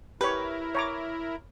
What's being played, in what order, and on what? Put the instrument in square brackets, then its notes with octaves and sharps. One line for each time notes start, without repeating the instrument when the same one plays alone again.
[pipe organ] E4 A#4 [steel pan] G4 C#5 [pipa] B4
[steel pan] C#5 A#5 D6